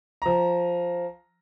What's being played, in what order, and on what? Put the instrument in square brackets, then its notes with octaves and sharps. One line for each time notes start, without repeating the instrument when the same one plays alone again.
[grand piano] F3 A#5